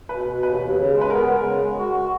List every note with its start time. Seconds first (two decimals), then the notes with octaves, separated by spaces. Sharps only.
0.09 B2 B4
0.26 B2
0.43 D#2 B4
0.60 D#2
0.76 C#3
0.93 G#3
1.01 B4
1.10 B3 A#4
1.27 G#3
1.44 C#3
1.61 G#3
1.78 F#4
1.95 F#4